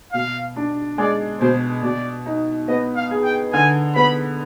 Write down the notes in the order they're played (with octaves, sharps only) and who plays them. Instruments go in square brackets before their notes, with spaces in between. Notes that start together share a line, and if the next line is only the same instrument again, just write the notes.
[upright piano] B2 [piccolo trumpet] F5
[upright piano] D4
[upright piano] G#3 [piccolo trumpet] D5
[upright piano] B2 [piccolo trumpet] C5
[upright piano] B2 [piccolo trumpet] D5
[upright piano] D#4
[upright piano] B3 [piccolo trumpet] D#5
[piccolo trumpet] F5
[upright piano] G#4
[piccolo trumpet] G5
[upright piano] D3 [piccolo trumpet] G#5
[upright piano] B3 [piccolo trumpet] B5